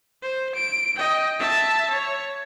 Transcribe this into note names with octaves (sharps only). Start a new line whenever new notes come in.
C5
D7
D#5 G5
E5 A5
C#5